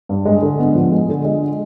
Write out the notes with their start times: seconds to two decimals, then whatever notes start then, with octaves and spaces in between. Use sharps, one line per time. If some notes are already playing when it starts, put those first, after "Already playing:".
0.09 G2
0.25 G#3
0.43 D3
0.59 B3
0.75 F3
0.92 G#3
1.09 D3
1.25 G#3